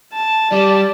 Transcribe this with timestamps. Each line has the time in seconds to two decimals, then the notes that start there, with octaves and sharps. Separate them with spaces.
0.13 A5
0.52 G3 D5